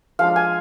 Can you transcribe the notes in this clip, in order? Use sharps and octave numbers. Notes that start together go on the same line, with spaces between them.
F3 G#3 D4 F5
G#5